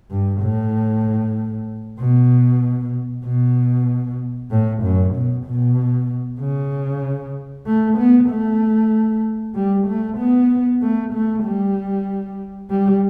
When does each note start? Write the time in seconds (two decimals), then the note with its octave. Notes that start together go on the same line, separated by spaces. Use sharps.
0.11 G2
0.41 A2
1.99 B2
3.25 B2
4.51 A2
4.83 F#2
5.15 B2
5.45 B2
6.40 C#3
7.66 A3
7.98 B3
8.30 A3
9.55 G3
9.87 A3
10.18 B3
10.82 A3
11.13 A3
11.44 G3
12.70 G3